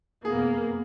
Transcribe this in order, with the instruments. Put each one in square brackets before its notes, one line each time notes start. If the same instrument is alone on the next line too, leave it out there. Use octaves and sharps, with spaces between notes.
[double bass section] F1 F#2 B3 [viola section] A#3 [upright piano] G#4